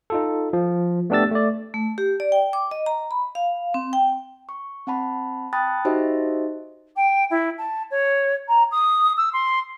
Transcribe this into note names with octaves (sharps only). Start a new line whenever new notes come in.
D#4 F4 A4
F3
A3 B3 D4 G4 E6 A6
A3 D5
A3
G4
D5
G5
D6
D#5
A#5
B5
F5
C4
G5
C#6
C4 F#5 A5 B5
G5 A5 B5 D#6 F#6 A6
D#4 F#4 G4 C5 D#5 E5
G5
E4
A5
C#5
A#5
D#6
E6
C6